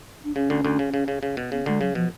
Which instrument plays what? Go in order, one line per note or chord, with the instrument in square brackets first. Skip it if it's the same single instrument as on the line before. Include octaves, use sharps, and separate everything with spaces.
[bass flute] D4
[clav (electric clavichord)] C#3 [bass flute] C#4
[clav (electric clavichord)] D2 D3
D2 D3
C#3
C#3
C#3
C#3
B2
[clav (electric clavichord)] C#3 [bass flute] B3
[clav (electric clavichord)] D2 D3 [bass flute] G#3
[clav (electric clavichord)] C#3 [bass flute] F#3
[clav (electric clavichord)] B2 [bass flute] F3